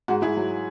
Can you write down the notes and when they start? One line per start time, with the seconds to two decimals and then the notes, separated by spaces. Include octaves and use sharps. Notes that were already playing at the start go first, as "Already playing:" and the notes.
0.08 G#2 F#4
0.22 G#2 E4 G#4
0.37 F#3